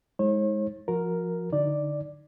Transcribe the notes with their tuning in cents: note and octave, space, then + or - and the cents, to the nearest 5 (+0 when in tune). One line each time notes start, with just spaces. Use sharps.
G#3 +0 D#4 +40 C#5 -45
F3 +0 F#4 -30 A#4 +0
D3 +0 D#4 +0 D5 +0